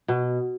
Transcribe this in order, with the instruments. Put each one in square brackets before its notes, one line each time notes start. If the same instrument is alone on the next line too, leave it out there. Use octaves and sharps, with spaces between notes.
[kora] B2